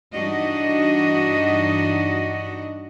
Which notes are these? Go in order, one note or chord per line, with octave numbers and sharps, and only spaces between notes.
G2 E3 D4 D#4 F#4 D#5